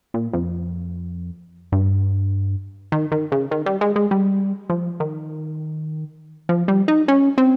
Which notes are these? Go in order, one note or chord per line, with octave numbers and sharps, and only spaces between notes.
A#2
F2
G2
D#3
D#3
C#3
D#3
G3
G#3
G#3
G3
F3
D#3
F3
G3
D#4
C#4
C4